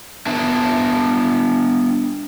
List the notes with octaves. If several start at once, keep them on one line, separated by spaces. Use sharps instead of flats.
B3 D4 E5 A5